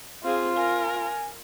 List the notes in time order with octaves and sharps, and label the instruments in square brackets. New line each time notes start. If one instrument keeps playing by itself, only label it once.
[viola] C4 G#4 [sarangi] F4 [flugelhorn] F5
[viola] A#4 [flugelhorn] G#5